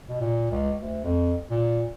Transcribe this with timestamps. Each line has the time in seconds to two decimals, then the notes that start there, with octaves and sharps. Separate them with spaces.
0.09 B2
0.21 A#2
0.51 C#2
0.82 D2
1.04 F2
1.51 A#2